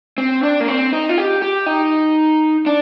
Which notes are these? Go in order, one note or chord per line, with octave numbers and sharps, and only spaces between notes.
C4
D4
A#3
C4
D#4
F4
G4
G4
D#4
D4